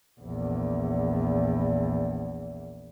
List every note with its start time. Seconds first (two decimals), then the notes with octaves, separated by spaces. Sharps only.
0.20 A#1 E2